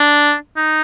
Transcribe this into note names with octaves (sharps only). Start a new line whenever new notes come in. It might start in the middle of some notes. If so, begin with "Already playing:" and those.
Already playing: D4
D#4